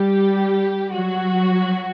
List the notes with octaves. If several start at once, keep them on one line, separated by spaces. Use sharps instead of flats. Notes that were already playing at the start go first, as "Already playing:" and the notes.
Already playing: G3 G4
F#3 F#4